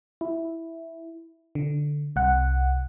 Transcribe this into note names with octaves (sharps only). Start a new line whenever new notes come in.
E4
D3
C2 F#5